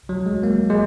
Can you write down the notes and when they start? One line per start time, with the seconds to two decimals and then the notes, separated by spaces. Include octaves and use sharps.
0.09 F#3
0.26 G#3
0.43 A#3
0.70 G#3